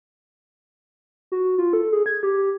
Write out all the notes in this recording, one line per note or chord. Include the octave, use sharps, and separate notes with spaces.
F#4
F4
A4
G#4
G#6
G4